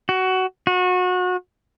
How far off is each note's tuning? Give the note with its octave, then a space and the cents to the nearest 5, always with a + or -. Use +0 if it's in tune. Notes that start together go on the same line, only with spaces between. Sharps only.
F#4 +15
F#4 -30